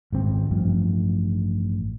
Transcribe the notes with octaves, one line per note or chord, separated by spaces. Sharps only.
G#1 C#2 C4
A1 G2 F3